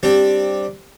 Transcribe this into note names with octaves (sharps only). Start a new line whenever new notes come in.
G3 C4 D4 G4